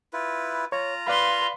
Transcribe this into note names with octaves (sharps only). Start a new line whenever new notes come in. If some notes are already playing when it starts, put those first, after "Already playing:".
E4 F4 B4
F4 C#5 A#5
B4 D5 F5 B5 C6